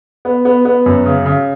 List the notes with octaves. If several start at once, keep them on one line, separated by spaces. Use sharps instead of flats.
B3
B3
B3
F#2
C#3
C#3